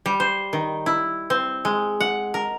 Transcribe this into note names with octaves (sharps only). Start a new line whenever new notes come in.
G3
C5
D#3
E4
C4
G#3
F#5
A#4